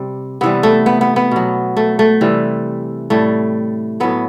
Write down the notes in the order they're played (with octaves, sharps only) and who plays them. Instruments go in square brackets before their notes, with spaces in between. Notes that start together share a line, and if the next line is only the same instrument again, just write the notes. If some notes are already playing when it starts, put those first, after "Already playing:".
Already playing: [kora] C3 G3
C3 E3 G3 B3
A3
B3
B3
B3
B2 F#3
A3
A3
C3 E3 G3
A2 G3 A3
A2 F#3 B3